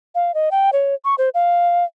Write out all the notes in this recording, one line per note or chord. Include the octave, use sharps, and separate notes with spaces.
F5
D#5
G5
C#5
C#6
C5
F5